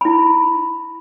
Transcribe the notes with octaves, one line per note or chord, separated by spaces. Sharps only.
E4 B5